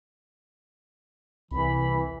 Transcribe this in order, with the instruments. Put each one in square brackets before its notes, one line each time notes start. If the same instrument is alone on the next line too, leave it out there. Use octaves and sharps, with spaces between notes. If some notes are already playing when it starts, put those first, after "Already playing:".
[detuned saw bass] C2 [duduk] E3 [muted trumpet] B5